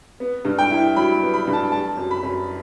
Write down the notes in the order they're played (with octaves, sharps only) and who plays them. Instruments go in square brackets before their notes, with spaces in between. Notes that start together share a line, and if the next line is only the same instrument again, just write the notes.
[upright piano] B3
G2
G5
E4
F#3 B5
B3
B5
G2
A5
G3 A5
F#2
B5
F#2